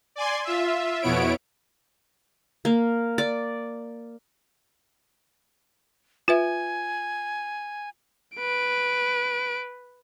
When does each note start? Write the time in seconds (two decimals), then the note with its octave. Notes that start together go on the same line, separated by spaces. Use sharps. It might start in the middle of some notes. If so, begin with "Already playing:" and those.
0.16 D5 G#5 C6
0.45 F4 E5
1.02 F2 B2 B3 E4 C#5 D7
2.65 A#3
3.18 D5
6.28 F4 B4 E5 G#5
8.37 B4 D7